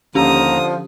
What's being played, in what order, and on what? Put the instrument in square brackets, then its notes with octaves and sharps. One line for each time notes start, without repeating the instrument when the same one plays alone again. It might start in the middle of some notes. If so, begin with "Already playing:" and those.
[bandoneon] D#2 A#5 [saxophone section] D3 F3 [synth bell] C#4 G4 [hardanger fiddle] D#6